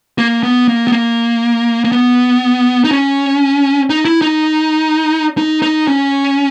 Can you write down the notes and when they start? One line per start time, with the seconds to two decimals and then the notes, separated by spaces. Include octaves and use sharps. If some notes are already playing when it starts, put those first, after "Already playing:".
0.18 A#3
0.43 B3
0.68 A#3
0.87 B3
0.92 A#3
1.84 A#3
1.92 B3
2.84 D#4
2.91 C#4
3.90 D#4
4.05 E4
4.22 D#4
5.38 D#4
5.62 D#4
5.87 C#4